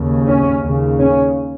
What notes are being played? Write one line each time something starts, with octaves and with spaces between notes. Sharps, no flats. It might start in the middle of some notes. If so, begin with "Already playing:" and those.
Already playing: D#2 C#3
C#4
D#2 C#3
C#4